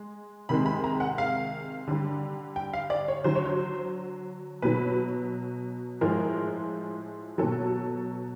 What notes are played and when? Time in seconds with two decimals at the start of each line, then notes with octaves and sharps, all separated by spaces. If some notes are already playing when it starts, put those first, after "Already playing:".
Already playing: G#3
0.49 C3 D#3 G#3 B5
0.66 B5
0.84 A#5
1.00 F#5
1.18 F5
1.88 D3 G3
2.56 G5
2.73 F5
2.90 D5
3.08 C#5
3.24 D3 F#3 C5
3.35 C#5
3.45 C5
4.62 B2 F#3 B4
6.01 A2 F3 G#3 A#4
7.38 B2 F#3 A4